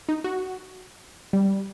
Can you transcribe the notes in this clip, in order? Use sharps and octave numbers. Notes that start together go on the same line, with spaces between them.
D#4
F#4
G3